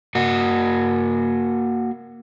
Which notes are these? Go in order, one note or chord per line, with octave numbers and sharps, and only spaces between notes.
A#3 F#4